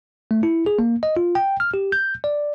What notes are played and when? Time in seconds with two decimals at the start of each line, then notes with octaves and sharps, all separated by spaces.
0.31 A3
0.43 E4
0.66 G#4
0.79 A#3
1.03 D#5
1.17 F4
1.35 G5
1.60 F6
1.74 G4
1.92 G6
2.24 D5